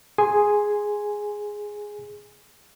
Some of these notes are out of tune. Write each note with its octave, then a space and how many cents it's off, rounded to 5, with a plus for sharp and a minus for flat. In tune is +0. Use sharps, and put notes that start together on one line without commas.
G#4 +0 G#5 +0 C6 +0